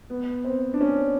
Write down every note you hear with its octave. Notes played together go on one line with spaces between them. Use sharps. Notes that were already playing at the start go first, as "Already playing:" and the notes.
B3
C4
D4
C#4